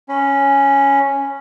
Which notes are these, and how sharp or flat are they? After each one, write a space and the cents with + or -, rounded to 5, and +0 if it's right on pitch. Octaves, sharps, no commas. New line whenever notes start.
C#4 +0 B5 +25